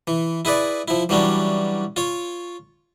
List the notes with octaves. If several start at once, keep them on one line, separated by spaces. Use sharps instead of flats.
E3
E4 G#4 B4 D5
F3 E4
E3 F#3 G3 C#4 D4
F4 C#5